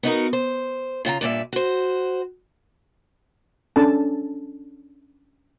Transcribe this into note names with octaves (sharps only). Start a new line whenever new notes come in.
B3 D#4 F#4 A#4
C5
C#3 F4 F#5 A#5
G2 A#2 D5 E5
F#4 C5
C#4 D4 A4 A5